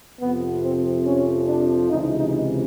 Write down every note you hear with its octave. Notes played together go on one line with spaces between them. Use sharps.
F2 C3 F3 B3
C4
C#4
D4
C#2 C3 E3 D#4
D#4